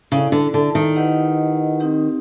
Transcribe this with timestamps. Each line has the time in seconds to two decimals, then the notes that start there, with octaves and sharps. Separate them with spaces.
0.11 C#3 E4 A4 D5
0.32 D3
0.54 D3
0.75 D#3
0.96 E4 G4 B4 D#5 F#5
1.80 C4 D#4 G4